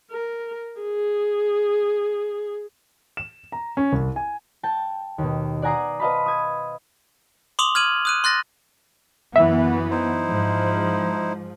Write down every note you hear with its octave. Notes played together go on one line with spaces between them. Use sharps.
A#4
G#4
E7
A#5
C#4
C2
G#5
G5 A5
D#2 B2
D5 F#5 G#5 A#5 D#6 C7
B4 C5 D#5 F5 A5 B5
D#6 G#6 D#7
C6 D6 D#6 F7 F#7
F6 G#6 D#7 F#7
D#6 F#6 D#7
C6 F#6 A6 A#6
F#2 E3 B3 E5
D#4 E4 C5
G#2 F3